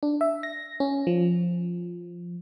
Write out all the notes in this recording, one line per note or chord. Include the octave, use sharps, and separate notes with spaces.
D4
E5
A#6
C#4
F3